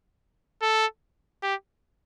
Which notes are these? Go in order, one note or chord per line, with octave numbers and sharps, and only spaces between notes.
A4
G4